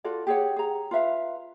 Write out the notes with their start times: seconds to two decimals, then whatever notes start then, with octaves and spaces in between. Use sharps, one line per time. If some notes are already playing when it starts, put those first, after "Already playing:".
0.04 F4 F#4 A4 D5
0.27 G4 G#4 C#5 F#5
0.56 G#4 A#5
0.91 F4 B4 E5 F5